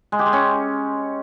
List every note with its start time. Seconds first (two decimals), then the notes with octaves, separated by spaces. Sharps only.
0.12 G#3
0.19 G4
0.26 G#3
0.33 C#4